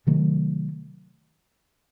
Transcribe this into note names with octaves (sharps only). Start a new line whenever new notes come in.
C3 D#3 F#3 A3